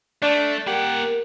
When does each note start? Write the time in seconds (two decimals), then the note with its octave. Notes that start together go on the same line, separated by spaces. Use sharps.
0.22 A3 D4
0.67 A#3 G4 A#4 F#5